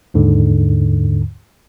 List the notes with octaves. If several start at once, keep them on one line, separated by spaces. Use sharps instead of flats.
D#2 G#2 D3